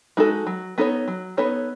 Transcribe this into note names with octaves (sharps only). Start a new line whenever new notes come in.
G#3 D#4 F#4 A4
F#3
B3 D#4 A4 C#5
F#3
B3 D#4 A4 C#5